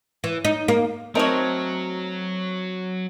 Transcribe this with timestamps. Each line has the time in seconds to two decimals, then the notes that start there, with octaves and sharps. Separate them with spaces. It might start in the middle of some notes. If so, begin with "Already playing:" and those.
0.24 E3
0.45 D#4
0.68 A#3
1.15 F#3 A3 C4 D#4 A#4 C#5